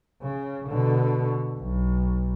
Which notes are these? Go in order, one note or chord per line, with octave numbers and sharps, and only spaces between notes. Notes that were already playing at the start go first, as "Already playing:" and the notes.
C#3
B2 D3
B1